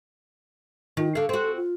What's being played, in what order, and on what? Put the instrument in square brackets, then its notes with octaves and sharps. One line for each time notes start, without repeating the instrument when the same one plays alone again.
[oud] D#3 [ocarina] F4
[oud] D3 F5 [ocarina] A4
[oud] C4 F#4 [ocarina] A4
[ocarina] F4